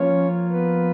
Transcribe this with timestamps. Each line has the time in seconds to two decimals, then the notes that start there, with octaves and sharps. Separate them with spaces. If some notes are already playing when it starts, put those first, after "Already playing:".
Already playing: F3 A#3 C#4 F4 C#5
0.50 B3 B4